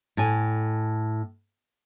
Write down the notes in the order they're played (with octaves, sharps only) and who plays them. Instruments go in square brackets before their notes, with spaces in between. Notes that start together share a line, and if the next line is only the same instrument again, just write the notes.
[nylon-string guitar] A2 G#5